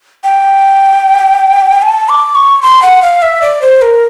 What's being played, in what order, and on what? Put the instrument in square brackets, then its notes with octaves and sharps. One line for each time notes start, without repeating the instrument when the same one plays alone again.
[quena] G5
A5
D6
C#6
C6
F#5
F5
E5
D5
C5
A#4